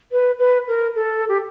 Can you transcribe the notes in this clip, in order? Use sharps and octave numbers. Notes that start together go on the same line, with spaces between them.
B4
B4
A#4
A4
G4